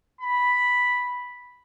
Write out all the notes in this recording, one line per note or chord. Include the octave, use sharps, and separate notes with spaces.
B5